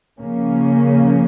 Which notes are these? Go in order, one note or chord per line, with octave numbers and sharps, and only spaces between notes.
C#3 F3 A#3 C#4